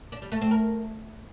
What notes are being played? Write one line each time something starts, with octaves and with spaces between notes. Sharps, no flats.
D4
G3
A3
C4
A#4